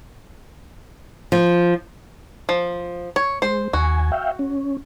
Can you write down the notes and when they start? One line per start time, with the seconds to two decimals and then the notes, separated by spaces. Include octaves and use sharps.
1.32 F3
2.49 F3
3.16 C#5
3.42 G#3 C5
3.73 D#2 F#4 G#5
4.12 E5 F5 G5
4.39 C#4